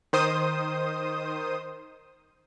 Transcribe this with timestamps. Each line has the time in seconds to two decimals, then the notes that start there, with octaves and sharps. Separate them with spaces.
0.13 D#3 C5 D#6